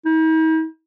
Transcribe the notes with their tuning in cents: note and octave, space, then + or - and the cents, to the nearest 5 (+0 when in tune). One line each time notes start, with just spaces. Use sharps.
D#4 +45